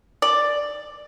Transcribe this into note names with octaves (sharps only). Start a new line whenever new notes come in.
D5